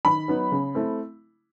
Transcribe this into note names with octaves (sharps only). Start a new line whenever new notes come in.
D#3 B5
F#3 B3 D#4
C#3
A3 C4 E4